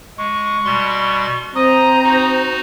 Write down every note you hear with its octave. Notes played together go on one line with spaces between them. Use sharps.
G#3 C#6
B2 G3 C6
C4 C5 D#5 A#5 D#6
D#4 F#4